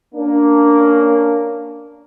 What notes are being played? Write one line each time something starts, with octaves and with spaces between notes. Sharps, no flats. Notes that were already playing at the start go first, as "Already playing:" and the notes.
A#3 C#4 D4